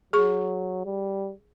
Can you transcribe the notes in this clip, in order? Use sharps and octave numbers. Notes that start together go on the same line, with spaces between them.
F#3 G#4 C#6
G3